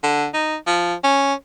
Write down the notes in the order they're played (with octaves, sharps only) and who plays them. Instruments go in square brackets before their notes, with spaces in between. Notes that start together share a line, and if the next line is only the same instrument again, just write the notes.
[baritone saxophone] D3
D#4
F3
C#4